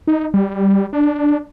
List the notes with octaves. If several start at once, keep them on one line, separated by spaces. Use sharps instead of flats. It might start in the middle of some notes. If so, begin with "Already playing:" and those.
D#4
G3
D4